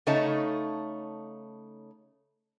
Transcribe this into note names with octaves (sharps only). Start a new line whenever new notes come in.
C#3 A3 D#4 C#5 A5